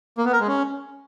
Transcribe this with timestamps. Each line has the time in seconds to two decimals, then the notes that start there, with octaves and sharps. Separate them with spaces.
0.18 A#3
0.25 B3
0.33 A#4
0.40 G#3
0.48 C#4